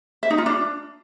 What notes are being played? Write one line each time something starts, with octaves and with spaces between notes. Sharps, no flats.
E5
D#4
F4
D4